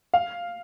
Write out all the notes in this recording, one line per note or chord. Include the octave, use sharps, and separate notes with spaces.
F5